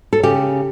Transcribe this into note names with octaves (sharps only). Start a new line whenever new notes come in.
A4
C#3 G4